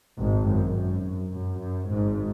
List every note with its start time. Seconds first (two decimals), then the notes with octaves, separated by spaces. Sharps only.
0.18 G#1 G#2
0.48 F#2
0.76 F#2
1.34 F#2
1.62 F#2
1.91 G#1 G#2